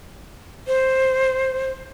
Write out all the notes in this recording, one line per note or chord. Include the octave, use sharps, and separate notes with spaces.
C5